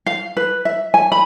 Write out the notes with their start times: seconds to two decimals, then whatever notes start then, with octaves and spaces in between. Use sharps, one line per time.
0.06 F5
0.37 B4
0.65 E5
0.94 G#5
1.12 B5